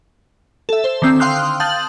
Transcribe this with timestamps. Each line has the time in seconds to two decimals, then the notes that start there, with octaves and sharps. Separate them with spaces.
0.69 A4 E5
0.84 C5
1.02 D3 D#3 C4 E6 G6
1.20 F5 G5 C6 D#6 F6 F#6
1.60 F5 A5 D#6 G6 A6 F#7